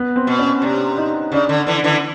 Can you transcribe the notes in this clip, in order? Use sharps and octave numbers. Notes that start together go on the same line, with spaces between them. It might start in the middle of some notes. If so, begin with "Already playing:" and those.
Already playing: B3
C4
B2
C#4
C3 D4
D#4
C#3 D4
D3
D3 E3
D3 E3